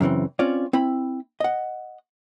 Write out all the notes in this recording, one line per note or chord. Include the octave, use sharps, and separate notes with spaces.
F#2 C#3 E3 C4
C4 C#4 F4 C#5 D5
C4 E4 B5
D#5 F#5